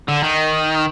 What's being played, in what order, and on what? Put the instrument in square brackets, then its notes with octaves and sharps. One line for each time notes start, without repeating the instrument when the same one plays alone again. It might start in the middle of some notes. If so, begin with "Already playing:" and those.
[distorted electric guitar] D3
D#3